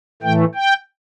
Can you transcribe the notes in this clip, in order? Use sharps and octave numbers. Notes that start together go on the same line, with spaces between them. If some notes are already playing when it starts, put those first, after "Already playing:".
A2 E3 A3 G5
G5